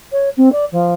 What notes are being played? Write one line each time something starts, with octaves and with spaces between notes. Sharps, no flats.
C#5
C4
D5
F3